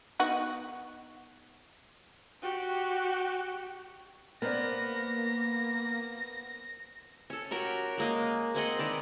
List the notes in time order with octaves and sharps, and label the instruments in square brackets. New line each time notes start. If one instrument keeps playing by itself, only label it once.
[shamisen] B3 D#4 F#4
[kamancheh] F#4 G4
[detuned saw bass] A#3 [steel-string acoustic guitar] B3 [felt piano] A#4 C5 D5 [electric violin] A#6
[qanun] C#4 A4
F#4 G4 A#4 C#5
G#3 A#3 D#5
C4 G#4 D#5 F#5
D#3 B4 D5